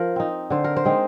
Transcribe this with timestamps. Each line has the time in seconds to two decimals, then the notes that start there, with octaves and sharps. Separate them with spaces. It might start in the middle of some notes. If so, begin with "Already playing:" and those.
Already playing: F3 A#4
0.16 C4 D#4
0.50 D3 C5
0.64 A#4
0.77 C5
0.85 G#3 C4 D#4